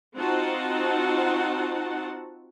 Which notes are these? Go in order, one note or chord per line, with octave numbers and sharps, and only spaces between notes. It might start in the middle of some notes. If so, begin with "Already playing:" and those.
C4 D#4 F4 F#4 F#5 A5